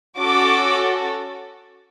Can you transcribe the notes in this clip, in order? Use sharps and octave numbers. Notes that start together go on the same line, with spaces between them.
C#4 F#4 A4 D6